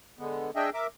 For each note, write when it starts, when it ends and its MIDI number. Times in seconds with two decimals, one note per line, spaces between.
0.19 0.51 50
0.19 0.51 56
0.19 0.51 59
0.56 0.70 62
0.56 0.70 68
0.56 0.70 75
0.56 0.70 76
0.56 0.70 79
0.74 0.87 70
0.74 0.87 76
0.74 0.87 86